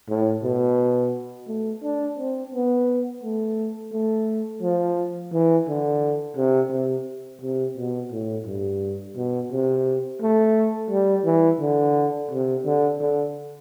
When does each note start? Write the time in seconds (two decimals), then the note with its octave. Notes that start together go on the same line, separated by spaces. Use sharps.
0.09 A2
0.43 B2
1.48 A3
1.84 D4
2.19 C4
2.54 B3
3.23 A3
3.93 A3
4.62 F3
5.33 E3
5.68 D3
6.37 C3
6.72 C3
7.41 C3
7.78 B2
8.12 A2
8.46 G2
9.17 B2
9.52 C3
10.22 A3
10.91 G3
11.25 E3
11.60 D3
12.31 C3
12.65 D3
13.00 D3